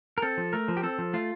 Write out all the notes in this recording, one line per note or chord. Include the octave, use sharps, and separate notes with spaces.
A#4
C4 A4
F3
A3 A#4
F3
G4
C4 A4
F3
A3 F4